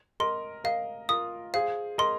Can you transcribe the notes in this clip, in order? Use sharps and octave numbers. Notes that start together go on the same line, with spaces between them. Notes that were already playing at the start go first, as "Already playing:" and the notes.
A#4 D#5 C6
A#4 D#5 F5
F4 A#4 D#6
G#4 C5 F5
A#4 D#5 C6